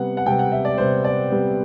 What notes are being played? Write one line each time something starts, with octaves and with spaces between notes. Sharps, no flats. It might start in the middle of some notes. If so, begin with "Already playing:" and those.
Already playing: C3 G3 B3 F#5
F#5
C3 G3 B3 G5
F#5
E5
D5
C3 G3 B3 C5
D5
C3 G3 B3